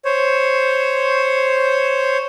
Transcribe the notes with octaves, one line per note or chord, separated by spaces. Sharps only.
C5 C#5